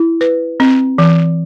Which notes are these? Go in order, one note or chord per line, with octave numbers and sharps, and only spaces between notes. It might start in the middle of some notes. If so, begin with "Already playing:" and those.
Already playing: E4
B4
C4
E3